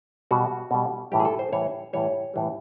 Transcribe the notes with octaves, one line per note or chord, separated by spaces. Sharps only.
B2 G3 F#4
B2 G3
A2 E3 G3 G4
G#4
A4
C5
A2 E3 G3 C#5
A2 E3 G3 C#5
A2 E3 G3